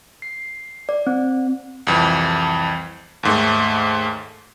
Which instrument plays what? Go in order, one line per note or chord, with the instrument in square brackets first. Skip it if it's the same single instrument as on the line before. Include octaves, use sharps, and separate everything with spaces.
[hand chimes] C7
D5
C4
[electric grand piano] C2 F2 E3
D#2 G#2 A3